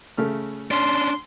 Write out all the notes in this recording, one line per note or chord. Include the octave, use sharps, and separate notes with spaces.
C#3 A3 F6
C#4 D4 C6